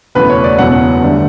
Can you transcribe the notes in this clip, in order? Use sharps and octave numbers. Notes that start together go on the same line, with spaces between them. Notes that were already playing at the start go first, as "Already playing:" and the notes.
F#1 E2 B2 A3 B4
C#5
D5
F#1 E2 B2 F#3 F#5
G2 D3 A3 D4